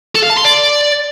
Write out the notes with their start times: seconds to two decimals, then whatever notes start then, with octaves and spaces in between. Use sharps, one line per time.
0.16 A4
0.23 F5
0.30 A5
0.38 C6
0.45 D5